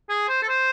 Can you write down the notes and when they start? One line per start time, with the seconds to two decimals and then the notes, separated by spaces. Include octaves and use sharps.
0.10 G#4
0.29 C5
0.42 A4
0.49 C5